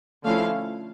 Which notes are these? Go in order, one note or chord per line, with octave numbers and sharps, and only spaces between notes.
D3 F3 A3 C#4 E4 F5